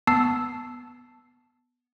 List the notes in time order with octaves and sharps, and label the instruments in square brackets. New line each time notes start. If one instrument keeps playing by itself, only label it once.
[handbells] B3 A5 E6 C7